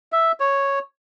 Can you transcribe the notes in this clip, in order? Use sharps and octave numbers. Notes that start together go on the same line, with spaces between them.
E5
C#5